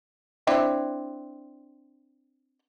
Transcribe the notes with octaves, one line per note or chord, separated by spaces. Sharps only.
C4 D4 E4